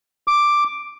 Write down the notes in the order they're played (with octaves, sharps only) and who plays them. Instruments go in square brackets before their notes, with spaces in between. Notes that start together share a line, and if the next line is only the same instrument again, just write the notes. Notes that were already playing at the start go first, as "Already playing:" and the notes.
[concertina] D6